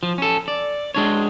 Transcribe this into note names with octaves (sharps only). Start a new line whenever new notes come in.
F3
C#4 A4
D5
G#3 D4 C#5